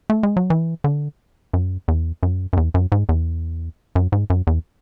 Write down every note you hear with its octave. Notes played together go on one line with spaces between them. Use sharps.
A3
G#3
F#3
E3
D3
F#2
E2
F#2
F#2
E2
F#2
G#2
E2
F#2
G#2
F#2
E2